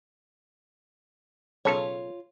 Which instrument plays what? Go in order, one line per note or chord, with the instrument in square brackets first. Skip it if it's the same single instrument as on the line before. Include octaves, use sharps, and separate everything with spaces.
[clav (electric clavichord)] B1 C#3 A4 [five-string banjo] F4 C#5